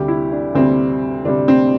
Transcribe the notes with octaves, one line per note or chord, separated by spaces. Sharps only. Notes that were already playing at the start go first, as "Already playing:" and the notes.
Already playing: D2 C3 G3 G4
E4
D4
D2 C3 G3 C4
D2 C3 G3 D4
C4